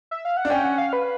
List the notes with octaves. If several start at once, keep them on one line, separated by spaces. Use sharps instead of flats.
E5
F5
F#5
D4
C#4 G5
F#5
F5
B4